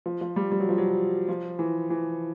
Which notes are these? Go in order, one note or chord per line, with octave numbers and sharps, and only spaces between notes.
F3
F3
G3
G3
F#3
F3
F#3
F3
E3
E3